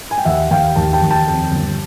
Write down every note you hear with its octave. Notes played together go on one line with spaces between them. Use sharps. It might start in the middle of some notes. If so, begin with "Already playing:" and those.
G#5
G5
D#2 E5 F#5
D#2 F5 G5
D#2 G5 A5
G5 A5
D#2
G5 A5
F2
G1